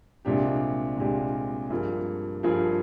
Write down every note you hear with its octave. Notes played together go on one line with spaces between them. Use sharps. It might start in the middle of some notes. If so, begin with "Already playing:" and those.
C2 A#2 G#3 D4 G4
C2 A#2 G#3 D4 G4
G2 F3 A#3 F4 G#4
G2 F3 A#3 F4 G#4